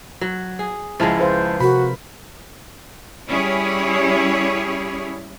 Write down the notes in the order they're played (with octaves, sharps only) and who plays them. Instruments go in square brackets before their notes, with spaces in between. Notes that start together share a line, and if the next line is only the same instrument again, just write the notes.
[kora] F#3
G#4
[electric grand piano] C#2 E4 A5 [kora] F3 G#3
[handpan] B4 C5 F5
[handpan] C3 A#4 [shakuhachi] F#4 [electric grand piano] B5
[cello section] G3 C#4 E4 G4 G#4 C#5